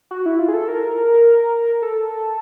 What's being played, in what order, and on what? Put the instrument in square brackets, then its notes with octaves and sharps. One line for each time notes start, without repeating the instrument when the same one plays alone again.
[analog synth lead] F#4
E4
F4
G#4
A4
A#4
A4